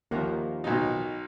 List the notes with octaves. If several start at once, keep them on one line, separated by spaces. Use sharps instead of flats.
D#2 D#3 F3 A#3 A#4 E5 F#5
B1 B2 D#4